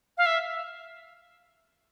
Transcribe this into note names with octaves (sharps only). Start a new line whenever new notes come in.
F5
E5